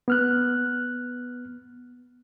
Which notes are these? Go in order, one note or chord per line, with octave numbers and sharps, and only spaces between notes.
B3 F6 F#6